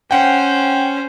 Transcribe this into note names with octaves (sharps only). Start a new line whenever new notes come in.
C#4 C5 F#5 G5